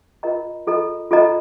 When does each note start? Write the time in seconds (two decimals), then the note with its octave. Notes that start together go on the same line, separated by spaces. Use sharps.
0.23 F4 A#4 D#5 A#5
0.67 F4 A4 D#5 A#5
1.11 F4 A4 D#5 A#5